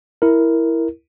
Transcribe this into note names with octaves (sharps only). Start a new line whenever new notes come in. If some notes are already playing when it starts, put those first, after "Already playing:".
E4 A#4